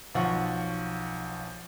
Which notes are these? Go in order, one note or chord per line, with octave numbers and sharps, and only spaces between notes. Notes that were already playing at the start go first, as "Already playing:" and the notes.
B1 F3 F#5 C#6